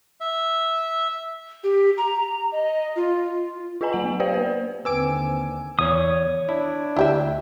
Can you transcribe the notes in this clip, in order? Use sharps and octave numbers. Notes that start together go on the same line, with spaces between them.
E5
G4
A#5
D#5
F4
F4 G#4 B4 D#5 G#5 A#5
F#3 F#5 F#7
B3
G4 B4 C5 D5 F5 G5
A#3 B4 C5
D#2 D3 C4 B4 G#5 D6 E6 D7
E2 C#5 D#6
D4 E4
D2 E4 G4 E5